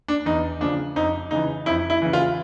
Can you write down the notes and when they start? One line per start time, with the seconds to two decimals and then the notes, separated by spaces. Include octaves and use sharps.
0.08 D4
0.25 E2 D#4
0.61 C#3 F3 D4
0.96 F2 D#4
1.31 C#3 E3 D#4
1.66 F2 E4
1.90 E4
2.02 C#3 E3
2.13 F4